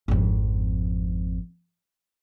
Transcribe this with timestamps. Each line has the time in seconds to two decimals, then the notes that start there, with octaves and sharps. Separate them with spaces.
0.08 G#1 F2